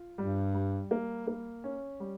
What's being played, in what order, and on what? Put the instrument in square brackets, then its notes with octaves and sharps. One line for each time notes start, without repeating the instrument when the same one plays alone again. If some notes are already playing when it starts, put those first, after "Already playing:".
Already playing: [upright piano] F4
[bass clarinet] G2 [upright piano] G3
[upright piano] G3
A#3
A#3
C#4
G3